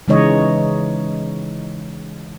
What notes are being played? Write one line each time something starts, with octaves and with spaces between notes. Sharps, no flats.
C#3 E3 G#3 D#4 C#5 D#5